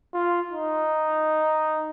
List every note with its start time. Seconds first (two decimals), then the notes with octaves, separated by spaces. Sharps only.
0.14 F4
0.51 D#4